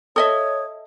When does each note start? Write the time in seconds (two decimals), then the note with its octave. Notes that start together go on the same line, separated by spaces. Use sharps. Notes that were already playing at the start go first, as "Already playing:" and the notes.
0.16 A4 C#5 D#5 E5 D#6